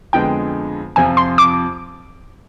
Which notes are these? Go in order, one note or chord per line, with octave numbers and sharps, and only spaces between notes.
F2 D3 G#3 B3 G5
F2 C3 F3 G#5
C6
D6